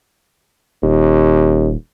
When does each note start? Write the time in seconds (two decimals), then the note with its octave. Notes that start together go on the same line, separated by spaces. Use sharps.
0.83 D#1 D#2